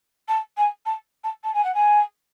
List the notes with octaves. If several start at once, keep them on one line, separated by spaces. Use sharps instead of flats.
A5
G#5
A5
A5
A5
G#5
F#5
G#5